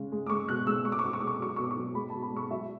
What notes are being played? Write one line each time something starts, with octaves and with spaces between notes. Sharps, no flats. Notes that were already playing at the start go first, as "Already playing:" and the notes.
Already playing: C#3 G#3
G#3
D6
G#3 C#6
B2 F#6
G#3 E6
G#3 C#6
D6
C#6
B2 D6
C#6
G#3 D6
C#6
D6
F#3 C#6
D6
B2 C#6
D6
C#6
F#3
G#3 B5
B2 A5
B5
G#3 C#6
F#3 E5